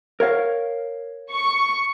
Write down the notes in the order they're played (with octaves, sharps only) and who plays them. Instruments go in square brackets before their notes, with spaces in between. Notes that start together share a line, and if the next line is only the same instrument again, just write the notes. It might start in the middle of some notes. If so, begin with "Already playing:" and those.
[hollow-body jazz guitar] A#4 C#5 F5
[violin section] C#6